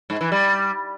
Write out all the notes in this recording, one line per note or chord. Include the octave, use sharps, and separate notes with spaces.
G#2
E3
G3